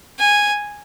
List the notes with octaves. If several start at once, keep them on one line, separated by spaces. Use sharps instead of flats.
G#5